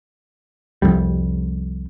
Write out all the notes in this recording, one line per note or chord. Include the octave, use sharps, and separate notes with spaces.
C2 F2 G3